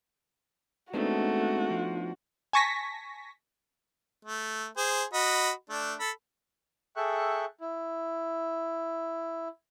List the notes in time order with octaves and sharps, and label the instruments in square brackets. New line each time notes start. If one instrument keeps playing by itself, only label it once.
[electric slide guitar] G#3 C4 [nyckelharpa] A3 [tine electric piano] B3 D4 D#4 [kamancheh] F#4
[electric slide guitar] F3
[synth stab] G#5 A5 C#6 A#6 B6
[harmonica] A3
G#4 C5
F#4 D#5 B5
A3 D4
A4 B5
[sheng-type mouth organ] G#4 A4 E5 G5 C#6 F#6
E4